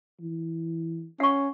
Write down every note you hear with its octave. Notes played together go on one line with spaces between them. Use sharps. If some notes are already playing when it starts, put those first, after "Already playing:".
E3
C#4 F#5 C#6